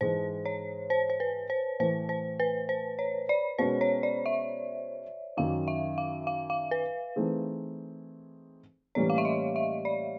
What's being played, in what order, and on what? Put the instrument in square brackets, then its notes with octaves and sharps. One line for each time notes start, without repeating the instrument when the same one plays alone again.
[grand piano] G#2 E3 G#3 [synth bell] C5
[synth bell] C#5
C5
C5
B4
C5
[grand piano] A2 E3 A3 [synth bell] C5
[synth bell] C5
B4
C5
C#5
D5
[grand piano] B2 G#3 C#4 F#4 B4 [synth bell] C5
[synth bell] C#5
D5
E5
[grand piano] F#2 D#3 F#3 [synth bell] F5
[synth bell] E5
F5
F5
F5
B4
[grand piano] E3 A3 C4 D#4 G#4
[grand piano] A2 E3 G3 A#3 C#4 [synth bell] C#5
[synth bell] F5
E5
D#5
E5
D5